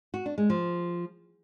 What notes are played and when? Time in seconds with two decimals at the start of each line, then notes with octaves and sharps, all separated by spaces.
0.14 F#4
0.26 D4
0.38 G#3
0.50 F3